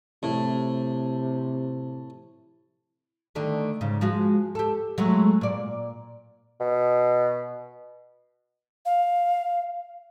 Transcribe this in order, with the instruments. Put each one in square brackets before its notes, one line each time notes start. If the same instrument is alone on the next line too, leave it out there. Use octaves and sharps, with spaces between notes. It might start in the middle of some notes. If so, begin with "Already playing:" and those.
[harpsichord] A2 [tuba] C3
[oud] D3 D#3 A3
G#2 C#3
F3 G#3 F#4
G4 A4
F#3 G#3 A3
A#2 D5
[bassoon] B2
[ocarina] F5